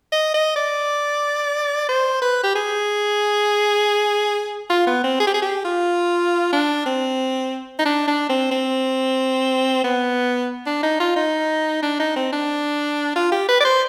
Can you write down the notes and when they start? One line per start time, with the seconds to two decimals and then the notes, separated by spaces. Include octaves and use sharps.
0.12 D#5
0.34 D#5
0.56 D5
1.89 C5
2.22 B4
2.44 G4
2.56 G#4
4.70 F4
4.87 B3
5.04 C4
5.20 G#4
5.27 G4
5.34 G#4
5.42 G4
5.65 F4
6.53 D4
6.86 C4
7.79 D#4
7.85 D4
8.08 D4
8.30 C4
8.52 C4
9.84 B3
10.67 D4
10.83 D#4
11.00 F4
11.16 D#4
11.83 D4
12.00 D#4
12.16 C4
12.33 D4
13.16 F4
13.32 G4
13.48 B4
13.61 D5
13.65 C5